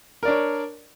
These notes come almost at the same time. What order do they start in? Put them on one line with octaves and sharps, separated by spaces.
A#4 D5 D4 C#5